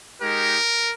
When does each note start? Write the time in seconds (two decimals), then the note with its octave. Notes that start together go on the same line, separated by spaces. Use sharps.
0.21 G#3 D#4 G4 A#4